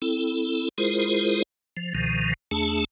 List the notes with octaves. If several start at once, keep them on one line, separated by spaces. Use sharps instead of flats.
C4 E4 A4
G#3 E4 F4 G#4 A#4 C5
F3
C#2 B2 D#3 F3
E2 A3 D4 G#4 A5